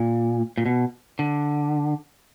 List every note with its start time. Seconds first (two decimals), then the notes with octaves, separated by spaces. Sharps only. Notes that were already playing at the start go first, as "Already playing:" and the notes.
Already playing: A#2
0.58 A#2
0.66 B2
1.19 D3